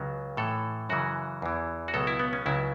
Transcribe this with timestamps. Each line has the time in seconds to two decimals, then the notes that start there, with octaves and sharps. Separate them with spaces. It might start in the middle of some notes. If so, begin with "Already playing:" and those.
Already playing: C#2 C#3 F#3
0.37 A2 E3 A4
0.89 F#2 C#3 E3 F#4
1.42 E2 E3
1.88 F#4
1.94 C#2 B2 F#3 A4
2.07 E4
2.19 B3
2.33 C#4
2.46 C#2 C#3 F#3 E4